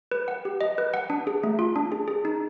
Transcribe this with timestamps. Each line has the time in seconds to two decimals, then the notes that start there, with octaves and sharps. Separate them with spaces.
0.11 B4
0.28 F#5
0.45 G4
0.61 D#5
0.78 B4
0.94 F#5
1.10 D4
1.27 G#4
1.44 A3
1.59 F4
1.76 D4
1.92 G#4
2.08 G#4
2.25 D#4